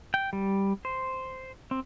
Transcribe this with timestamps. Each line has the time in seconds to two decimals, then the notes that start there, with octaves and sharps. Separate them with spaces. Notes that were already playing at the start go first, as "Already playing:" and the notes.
0.14 G5
0.33 G3
0.85 C5
1.71 C4